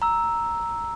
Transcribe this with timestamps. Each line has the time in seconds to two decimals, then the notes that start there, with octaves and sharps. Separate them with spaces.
0.02 A#5 E6